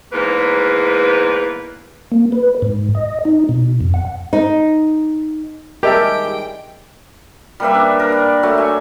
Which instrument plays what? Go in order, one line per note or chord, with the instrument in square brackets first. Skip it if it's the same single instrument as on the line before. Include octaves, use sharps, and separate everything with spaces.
[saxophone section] E2 G#2 A#3 B4
[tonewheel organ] A#3
B4
G#2
D#5
D#4
B2
F2
F#5
[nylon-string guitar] D#4
[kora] D#3 G3 G#3 [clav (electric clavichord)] G4 [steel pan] A#4 E5 A5 [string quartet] G5
[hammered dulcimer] G3 A#3 B4 E5
D4
A#4
D5
F#3 A3
E5 G#5